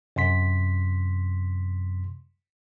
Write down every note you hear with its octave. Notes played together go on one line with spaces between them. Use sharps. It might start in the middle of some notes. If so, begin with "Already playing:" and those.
F#2 C3 C6 B6